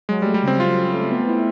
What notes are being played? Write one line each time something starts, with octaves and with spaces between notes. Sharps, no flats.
F#3 G#3
G3
A3
G3
C#3
C4
C4 F4
F#3
A3
B3
E4